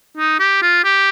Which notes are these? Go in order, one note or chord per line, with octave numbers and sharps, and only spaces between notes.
D#4
G4
F4
G4